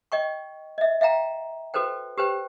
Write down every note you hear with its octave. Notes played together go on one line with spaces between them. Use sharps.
D#5 G5 C#6
D#5 E5
E5 F5 G5 A#5
F#4 A4 B4 C5 G5
G4 B4 C5 G5